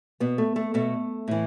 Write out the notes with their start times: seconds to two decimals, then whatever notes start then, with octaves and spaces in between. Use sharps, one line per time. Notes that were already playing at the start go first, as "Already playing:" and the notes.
0.20 B2 B3
0.38 A3
0.56 A3
0.74 B2 A3
1.28 A2 E3